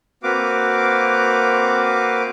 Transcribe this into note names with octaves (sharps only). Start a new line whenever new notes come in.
A#3 C4 F#4 B4 F5 D6